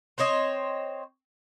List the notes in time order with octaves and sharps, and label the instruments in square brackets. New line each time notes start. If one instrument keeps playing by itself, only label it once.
[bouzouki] C4 C5 C#5 D#5